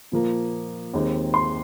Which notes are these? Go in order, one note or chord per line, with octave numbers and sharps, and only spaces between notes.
A#2 F3 A#3
D#2 D#3 G#3 C4
C6